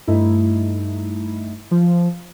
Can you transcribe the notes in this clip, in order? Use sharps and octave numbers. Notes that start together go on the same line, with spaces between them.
G2 A3 D#4 E4
F3